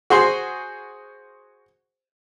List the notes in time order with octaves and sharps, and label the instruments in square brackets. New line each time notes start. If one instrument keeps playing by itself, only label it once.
[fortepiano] F#4 G#4 C5 C6